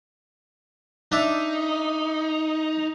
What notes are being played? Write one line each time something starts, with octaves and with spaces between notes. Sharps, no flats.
D4 D#4 E5